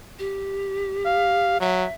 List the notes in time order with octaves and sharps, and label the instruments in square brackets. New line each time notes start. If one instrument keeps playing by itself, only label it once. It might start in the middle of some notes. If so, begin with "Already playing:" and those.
[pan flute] G4
[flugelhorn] F5
[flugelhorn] F#3 [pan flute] E5